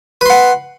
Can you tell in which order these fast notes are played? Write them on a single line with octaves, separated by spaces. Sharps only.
B4 C6 F#5